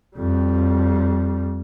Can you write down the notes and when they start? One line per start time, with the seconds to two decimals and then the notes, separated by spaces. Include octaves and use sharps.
0.16 F2 G3